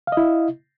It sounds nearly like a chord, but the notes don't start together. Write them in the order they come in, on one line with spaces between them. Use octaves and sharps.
F5 D#5 E4